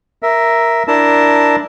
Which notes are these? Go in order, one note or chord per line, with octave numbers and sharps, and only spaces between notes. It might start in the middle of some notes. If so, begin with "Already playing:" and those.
A#4 E5
D4 E4 A#4 A5